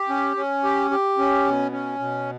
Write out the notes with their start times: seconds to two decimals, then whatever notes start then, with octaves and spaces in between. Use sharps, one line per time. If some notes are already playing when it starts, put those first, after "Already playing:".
Already playing: G4
0.09 C#4
0.36 C#4
0.64 G4
0.91 G4
1.18 C#4
1.45 B2
1.72 C#4
1.99 B2